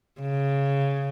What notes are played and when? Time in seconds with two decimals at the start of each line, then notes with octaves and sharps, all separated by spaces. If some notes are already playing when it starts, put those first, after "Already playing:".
0.21 C#3